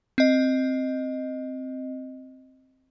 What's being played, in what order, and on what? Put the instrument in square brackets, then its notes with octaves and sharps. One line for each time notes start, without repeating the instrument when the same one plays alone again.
[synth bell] C4 D#5